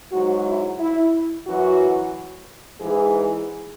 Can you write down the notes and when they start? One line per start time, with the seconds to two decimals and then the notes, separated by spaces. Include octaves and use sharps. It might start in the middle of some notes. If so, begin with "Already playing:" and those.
0.11 G#2 F#3 F#4
0.45 E4
0.78 E4
1.46 F#2 E3 F#4
2.79 G#2 E3 G#4